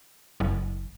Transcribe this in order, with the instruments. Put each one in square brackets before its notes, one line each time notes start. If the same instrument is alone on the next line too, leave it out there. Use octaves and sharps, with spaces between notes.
[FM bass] F#1